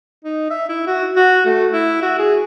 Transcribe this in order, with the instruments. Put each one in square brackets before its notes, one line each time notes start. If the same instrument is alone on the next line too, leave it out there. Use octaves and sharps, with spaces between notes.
[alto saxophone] D#4
E5
E4
F#4
F#4
A3
E4
F#4
G#4